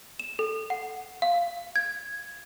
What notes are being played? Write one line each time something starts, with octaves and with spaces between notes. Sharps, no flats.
E7
A4
F#5
F5
G#6